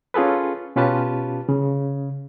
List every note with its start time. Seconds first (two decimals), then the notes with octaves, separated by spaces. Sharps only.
0.14 C#4 F4 G#4 A4 B4
0.76 B2 C#4 F4 G4 B4 A5
1.49 C#3